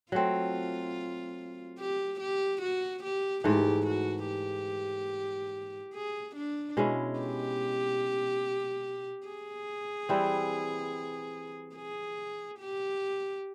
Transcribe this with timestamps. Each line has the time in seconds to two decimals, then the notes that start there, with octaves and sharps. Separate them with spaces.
0.12 F#3 A3 C4 F4
1.79 G4
2.20 G4
2.62 F#4
3.03 G4
3.44 G#2 E3 A3 G4
3.86 F#4
4.28 G4
5.94 G#4
6.36 D4
6.77 B2 G#3 C#4 E4
7.19 G4
9.27 G#4
10.09 E3 G3 C4 E4
11.76 G#4
12.59 G4